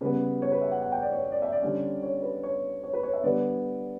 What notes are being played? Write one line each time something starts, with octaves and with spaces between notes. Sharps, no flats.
C#3 G3 B3 B4
C#5
B4
E5
F#5
F#5
G5
D5
C#5
D5
E5
D5
D3 G3 C#4
C#5
B4
C#5
C#5
B4
C#5
E5
D3 G3 B3 D5